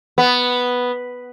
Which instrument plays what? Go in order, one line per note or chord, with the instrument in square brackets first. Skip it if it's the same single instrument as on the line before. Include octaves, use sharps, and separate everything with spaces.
[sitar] B3